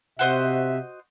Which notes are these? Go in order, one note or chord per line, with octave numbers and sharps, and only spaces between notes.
C3 F#4 C5 D#5 E5